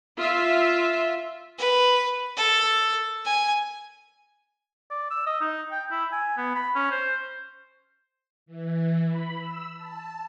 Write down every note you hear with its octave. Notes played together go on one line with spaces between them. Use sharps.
F4 E5
B4
A4
G#5
D5
E6
D#5
D#4
G5
E4
G#5
B3
B5
C#4
C5
E3
B5
E6
A5